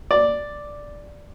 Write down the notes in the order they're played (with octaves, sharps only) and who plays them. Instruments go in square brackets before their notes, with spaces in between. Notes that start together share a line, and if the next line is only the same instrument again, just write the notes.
[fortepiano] D5